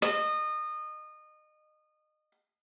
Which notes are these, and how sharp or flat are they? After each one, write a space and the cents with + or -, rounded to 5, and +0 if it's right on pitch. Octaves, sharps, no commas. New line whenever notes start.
D#5 -25